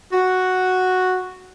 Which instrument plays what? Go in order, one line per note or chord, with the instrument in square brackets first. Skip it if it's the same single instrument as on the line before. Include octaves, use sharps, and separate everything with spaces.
[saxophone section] F#4